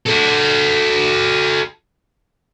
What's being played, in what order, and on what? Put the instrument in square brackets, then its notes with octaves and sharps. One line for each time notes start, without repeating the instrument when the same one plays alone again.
[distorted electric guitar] F#4 A4